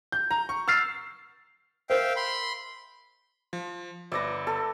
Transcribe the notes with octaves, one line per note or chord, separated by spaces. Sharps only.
G6
A#5
C#6
E6 F6 A6 C7
A#4 C5 E5 F5 G5
B5 C6
F3
G1 B4 D5 E5 A#6
A4